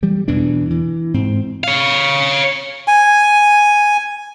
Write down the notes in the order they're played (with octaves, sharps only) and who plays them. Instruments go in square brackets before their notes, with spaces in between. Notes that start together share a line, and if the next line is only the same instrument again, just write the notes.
[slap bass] E3 G3
E2 B2 E3 D4
E3
G#2 C4
[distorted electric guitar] C#5 F5
[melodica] G#5